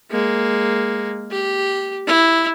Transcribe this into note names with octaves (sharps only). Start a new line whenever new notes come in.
G#3 A#3
G4
E4